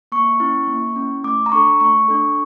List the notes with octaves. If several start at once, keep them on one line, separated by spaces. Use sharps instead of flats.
A#3 C#6
C#4 E4
A#3
C#4 E4
A3 D6
A#5
D4 A4 C#6
A3 C#6
D4 A4